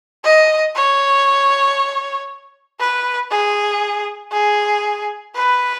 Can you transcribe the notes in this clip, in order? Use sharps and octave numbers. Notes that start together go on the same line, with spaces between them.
D#5
C#5
B4
G#4
G#4
B4